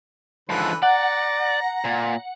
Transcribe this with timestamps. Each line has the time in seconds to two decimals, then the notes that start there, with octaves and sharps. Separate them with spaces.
0.49 G#2 D3 E3 F3 B4
0.83 D5 F#5 A#5
1.84 A#2